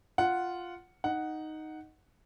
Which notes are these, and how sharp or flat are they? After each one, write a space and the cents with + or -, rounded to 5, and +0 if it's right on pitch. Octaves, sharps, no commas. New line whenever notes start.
F4 +0 F#5 +0
D#4 +0 F#5 +0